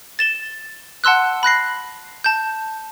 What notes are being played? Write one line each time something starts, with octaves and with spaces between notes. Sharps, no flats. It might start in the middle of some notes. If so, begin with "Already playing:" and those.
A6 E7 G7
F#5 A5 C6 E6 F#6
B5 F#6 A#6 C7
A5 G6